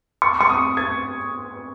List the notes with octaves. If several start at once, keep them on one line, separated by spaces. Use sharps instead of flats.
C#6
C#6
D#6
G#6